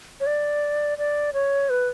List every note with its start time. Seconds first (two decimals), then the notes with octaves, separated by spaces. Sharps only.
0.20 C#5
0.27 D5
0.98 D5
1.33 C#5
1.70 B4